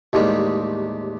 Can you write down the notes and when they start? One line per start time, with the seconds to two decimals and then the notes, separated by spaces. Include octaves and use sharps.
0.13 A1 D#2 G3 G#3